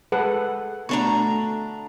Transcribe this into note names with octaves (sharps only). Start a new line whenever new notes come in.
G#3 A4 B4 F#5
B2 D3 A3 D4 A#5 C#6